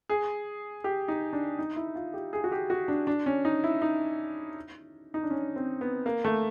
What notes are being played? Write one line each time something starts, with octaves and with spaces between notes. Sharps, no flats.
G#4
G4
D#4
D4
D#4
E4
F4
G4
G#4
F#4
G4
F#4
D4
D4
C#4
D#4
E4
D#4
D#4
D4
C#4
C4
B3
A#3
A3